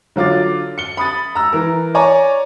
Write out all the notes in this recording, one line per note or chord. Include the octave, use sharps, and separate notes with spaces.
D3 F#3 F4 D6 A6
C#7 G7
B5 D#6 A6
A#5 E6
E3 A#4
C#5 D5 G#5 A#5 C#6